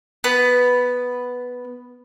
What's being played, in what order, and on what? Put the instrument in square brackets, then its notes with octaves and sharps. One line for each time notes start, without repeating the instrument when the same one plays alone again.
[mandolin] B3 B4